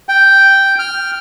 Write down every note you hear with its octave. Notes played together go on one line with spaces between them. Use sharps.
G5
F6